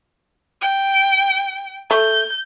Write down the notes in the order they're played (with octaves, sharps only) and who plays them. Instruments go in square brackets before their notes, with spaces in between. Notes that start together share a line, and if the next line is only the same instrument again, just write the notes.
[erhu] G5
[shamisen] A3 [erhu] G6